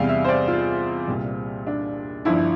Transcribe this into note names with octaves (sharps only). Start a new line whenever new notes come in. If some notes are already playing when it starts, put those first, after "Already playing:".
Already playing: E2 C3 G3 F5
E5
C5
D5
F4
C2 A#2 G3
D4
G1 G2 F3 E4